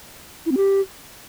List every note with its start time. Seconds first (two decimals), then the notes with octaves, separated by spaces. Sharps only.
0.46 E4
0.51 C4
0.57 G4